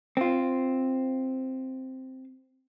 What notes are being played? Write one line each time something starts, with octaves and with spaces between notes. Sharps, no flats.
C4 F4